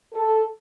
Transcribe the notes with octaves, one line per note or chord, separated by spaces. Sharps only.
A4